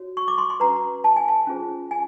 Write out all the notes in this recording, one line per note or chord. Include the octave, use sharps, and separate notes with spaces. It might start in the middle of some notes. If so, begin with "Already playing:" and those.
Already playing: F#4 C#5
C#6
D6
C6
C6
C#4 F#4 B4 A#5
A5
G#5
A5
C#4 F4 G#4 C5
G#5